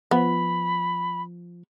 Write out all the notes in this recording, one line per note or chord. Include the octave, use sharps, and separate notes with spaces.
F3 B3 B5